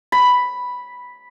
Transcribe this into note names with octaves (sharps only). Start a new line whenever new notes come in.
B5